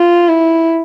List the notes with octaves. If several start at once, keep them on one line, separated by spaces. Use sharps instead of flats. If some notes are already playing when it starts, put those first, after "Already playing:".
Already playing: F4
E4